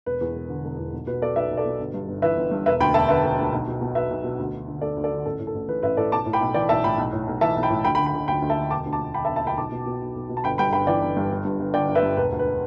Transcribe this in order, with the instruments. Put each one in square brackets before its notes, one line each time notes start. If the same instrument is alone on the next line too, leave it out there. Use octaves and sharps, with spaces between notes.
[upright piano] E1 B4
E2
E1
D3
E1
E2
B1
B2 B4
B2 A4 D5
B1 B4 E5
B1
A4 D5
B2
G1
G2
G1
E3 B4 E5
G1
G2
E1 B4 E5
D2 G5 B5
E1 E5 A5
D3 B4 E5
E1
D2
B1
B2
B2
B1 B4 E5
B1
B2
D2
D3
D3
D2 A4 D5
D2
A4 D5
D3
A1 A4
A2
A4
A1
E3 B4
A1 B4 E5
A2 A4 D5
B1 A5 D6
A2
G5 B5
B1
E3 D5 G5
B1 E5 A5
A2 G5 B5
B1
A2
B1
E3 E5 A5
B1
G5 B5
A2
D2 G5 B5
G5 B5
D3
G5 B5
D3
D2 G5 B5
D2
E5 A5
D3
E1 A5 D6
D2
A5 D6
E1
D3 G5 B5
E5 A5
E1
E5 A5
D2 G5 B5
B1 A5 D6
B2
B2
B1
B1
B2
A5
G1 G5 B5
G2 G5 B5
G1 G5 B5
E3 D5 G5
G1
G2
G1
G2
G1
D3 D5 G5
G1
B4 E5
G2
E1 B4
D2
B4